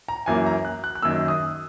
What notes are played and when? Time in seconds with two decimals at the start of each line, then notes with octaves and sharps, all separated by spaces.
0.08 A#5
0.26 F#2 E3 A#3 G#5
0.46 A#5
0.65 F#6
0.84 F#6
0.95 F#6
1.02 F#2 D#3 A#3 E6
1.28 D#6